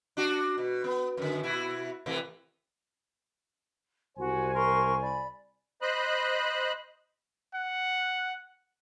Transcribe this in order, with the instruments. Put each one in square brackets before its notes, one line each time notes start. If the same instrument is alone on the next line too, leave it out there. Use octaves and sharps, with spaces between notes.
[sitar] D4 F#4
B2
B3
F#2 D3
B2 E4 F#4
A2 C3 E3
[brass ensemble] C2 C5 G#5 [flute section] F#4
[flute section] A#4 C6 C#6
D5 B5
[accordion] C5 D#5 B5 F#6
[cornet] F#5